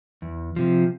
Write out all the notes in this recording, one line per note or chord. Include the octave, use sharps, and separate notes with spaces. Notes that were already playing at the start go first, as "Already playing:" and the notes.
E2
C3 F3